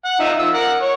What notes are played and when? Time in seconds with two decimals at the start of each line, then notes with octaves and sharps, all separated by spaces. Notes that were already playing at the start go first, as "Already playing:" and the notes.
0.05 F#5
0.20 D#4 F4 E5
0.39 F3 E6
0.54 A#4 F#5
0.82 C#5